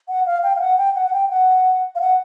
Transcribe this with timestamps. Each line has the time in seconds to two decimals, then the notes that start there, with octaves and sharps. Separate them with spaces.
0.08 F#5
0.26 F5
0.43 G5
0.56 F5
0.61 F#5
0.78 G5
0.95 F#5
1.07 F#5
1.13 G5
1.31 F#5
1.95 F5
2.00 F#5